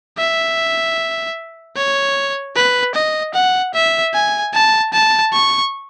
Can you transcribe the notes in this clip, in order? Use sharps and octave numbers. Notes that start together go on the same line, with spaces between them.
E5
C#5
B4
D#5
F#5
E5
G#5
A5
A5
C#6